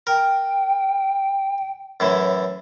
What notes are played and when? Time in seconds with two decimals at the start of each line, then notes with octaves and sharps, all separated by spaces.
0.07 A#4 G5
2.00 F#2 A2 E3